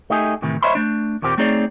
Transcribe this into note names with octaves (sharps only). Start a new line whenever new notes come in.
A3 D#4 G4 G#4
A2 C3 D#3 E3
C5 C#5 D#5 E5 B5 C6
A3 D4
D#2 A#2 A#3 C4 G4
A3 C4 D#4 G#4 C#5 D5